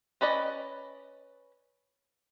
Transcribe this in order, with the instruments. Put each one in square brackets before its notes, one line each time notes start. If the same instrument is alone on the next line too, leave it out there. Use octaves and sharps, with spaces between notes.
[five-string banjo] C#4 B4 D5 D#5